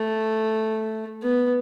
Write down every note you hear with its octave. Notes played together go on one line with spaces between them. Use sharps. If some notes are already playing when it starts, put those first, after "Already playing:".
Already playing: A3
B3